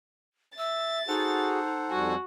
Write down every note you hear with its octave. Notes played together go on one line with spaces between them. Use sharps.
E5 E6 A6
D#4 F#4 G#4 A4 C5 F#5
F2 G3 F#4 G#5